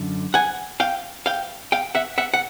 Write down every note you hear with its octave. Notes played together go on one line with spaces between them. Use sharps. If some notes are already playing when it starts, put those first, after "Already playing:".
Already playing: F#2 D3
F#5 G#5
F5 G5
F5 G5
F5 G5
E5 F#5
E5 F#5
F#5